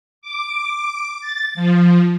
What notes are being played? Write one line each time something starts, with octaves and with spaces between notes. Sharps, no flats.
D6
A6
F3